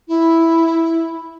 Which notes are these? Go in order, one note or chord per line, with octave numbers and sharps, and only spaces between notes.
E4